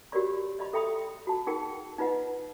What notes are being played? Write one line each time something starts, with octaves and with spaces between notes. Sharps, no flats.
F#4 G4 A#4 C#5 D5 C6
D5 D#5 B5 C6
A4 E5 G5 B5 C6 D#6
F#4 A5
D#4 G#4 A#4 F#5 G5
D#4 F4 B4 D#5 F#5